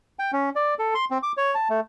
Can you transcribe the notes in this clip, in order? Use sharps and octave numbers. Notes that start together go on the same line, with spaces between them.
G5
C#4
D5
A4
C6
C4
D6
C#5
A5
A3